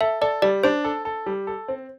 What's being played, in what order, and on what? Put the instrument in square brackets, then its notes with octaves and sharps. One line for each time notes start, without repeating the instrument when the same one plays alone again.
[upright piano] A4 [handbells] E5
[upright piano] A4 [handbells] D5
[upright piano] G3 [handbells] D5
[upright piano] D4 [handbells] C5
[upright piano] A4
A4
G3
A4
C4